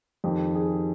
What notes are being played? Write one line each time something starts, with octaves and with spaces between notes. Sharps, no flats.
F2 D#3 G4
G#4